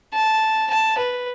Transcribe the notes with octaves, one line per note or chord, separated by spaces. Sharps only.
A5
A5
B4